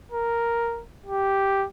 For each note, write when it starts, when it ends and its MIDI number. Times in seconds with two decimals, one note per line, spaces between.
0.11 0.82 70
1.06 1.66 67